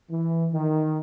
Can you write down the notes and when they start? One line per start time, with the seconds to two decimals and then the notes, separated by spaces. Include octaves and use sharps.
0.11 E3
0.53 D#3